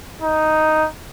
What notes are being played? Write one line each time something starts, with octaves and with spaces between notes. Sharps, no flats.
D#4